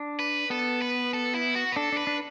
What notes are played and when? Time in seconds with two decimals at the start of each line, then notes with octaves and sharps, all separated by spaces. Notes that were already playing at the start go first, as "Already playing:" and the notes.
Already playing: D4
0.19 B4
0.50 B3 A4
0.82 B4
1.14 A4
1.35 E4
1.55 F#4
1.72 B4
1.76 D4 A4
1.92 D4 B4
2.07 D4